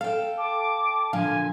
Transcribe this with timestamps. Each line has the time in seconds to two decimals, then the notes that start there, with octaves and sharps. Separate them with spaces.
0.01 A4 F5 G5
0.38 A5 D6
1.13 A#2 D3 F3 F5 G#5